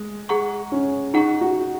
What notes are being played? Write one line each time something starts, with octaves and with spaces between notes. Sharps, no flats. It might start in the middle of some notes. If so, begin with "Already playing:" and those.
Already playing: G#3
G#4 F#5 A#5 C#6
C#4
D#4 G#4 F#5 A#5 C#6
F#4